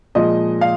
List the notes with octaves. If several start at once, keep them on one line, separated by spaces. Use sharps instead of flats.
A#2 F3 G#3 D#5
F5